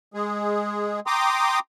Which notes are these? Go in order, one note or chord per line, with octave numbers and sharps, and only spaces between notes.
G#3 G#4
G5 A#5 C6 D6 D#6